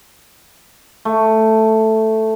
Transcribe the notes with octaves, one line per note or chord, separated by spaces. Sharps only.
A3